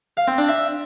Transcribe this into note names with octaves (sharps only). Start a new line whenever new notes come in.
F5
C4
D4
E5